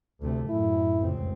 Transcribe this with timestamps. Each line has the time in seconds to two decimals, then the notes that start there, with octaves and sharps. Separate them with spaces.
0.22 D2 C3 A3
0.50 F#2 A2 E4
1.00 F1 C#2 C4